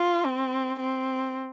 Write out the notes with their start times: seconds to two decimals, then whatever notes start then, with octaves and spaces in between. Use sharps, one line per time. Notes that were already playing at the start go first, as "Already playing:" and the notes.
Already playing: F4
0.25 C4
0.79 C4